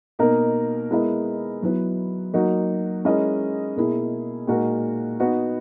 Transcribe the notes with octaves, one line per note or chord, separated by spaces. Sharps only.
B2 A#3 D#4 A#4
G#3 B3 E4 A#4 D#5
F#3 B3 E4 B4
F#3 A#3 D#4 F#4
G#3 C#4 E4 A#4 D#5
B2 A#3 E4 G#4
A#2 G#3 D#4 F#4 A#4
B3 D#4 F#4 B4